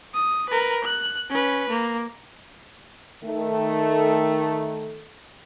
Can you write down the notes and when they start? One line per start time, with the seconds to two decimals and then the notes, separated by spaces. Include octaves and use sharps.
0.14 D#6
0.49 A#4 B4
0.84 F#6
1.30 C#4 B4
1.70 A#3
3.24 D#3 A3